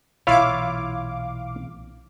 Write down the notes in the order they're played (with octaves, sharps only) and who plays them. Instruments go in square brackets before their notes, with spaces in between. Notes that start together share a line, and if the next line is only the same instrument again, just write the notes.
[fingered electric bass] B1 A#2 E3 [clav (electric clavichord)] E4 F4 C#5 [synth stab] F5 D6